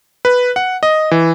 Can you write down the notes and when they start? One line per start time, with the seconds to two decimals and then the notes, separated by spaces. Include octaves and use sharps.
0.25 B4
0.56 F#5
0.83 D#5
1.11 E3